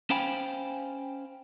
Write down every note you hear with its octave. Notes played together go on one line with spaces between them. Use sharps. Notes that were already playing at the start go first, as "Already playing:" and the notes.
C#4 C5 F5 G5 G#5 B5